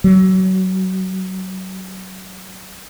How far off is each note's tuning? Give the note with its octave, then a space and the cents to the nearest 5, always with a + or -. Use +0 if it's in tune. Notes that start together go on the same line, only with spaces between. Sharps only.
F#3 +25